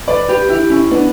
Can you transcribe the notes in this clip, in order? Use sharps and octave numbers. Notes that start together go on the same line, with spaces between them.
B4 D5
G4 B4
E4 G4
C#4 E4
B3 D4